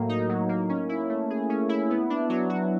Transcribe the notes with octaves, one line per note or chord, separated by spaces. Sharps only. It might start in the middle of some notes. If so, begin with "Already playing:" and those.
Already playing: A2 F#3 A#3
D#4
F#3
A#3
C#4
E4
A3
G#4
C#4
E4
B3
D4
F#3
F#4